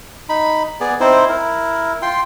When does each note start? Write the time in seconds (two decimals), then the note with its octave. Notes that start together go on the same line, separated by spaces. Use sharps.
0.29 D#4 B5
0.80 B3 G#4 D5
1.00 C4 D#4 E4 C5
1.29 E4 A#4
2.02 F4 G5 C6